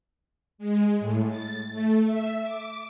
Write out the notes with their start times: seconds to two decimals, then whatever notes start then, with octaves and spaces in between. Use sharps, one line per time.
0.58 G#3
1.00 A2
1.29 A6
1.71 A3
2.05 E5
2.43 D6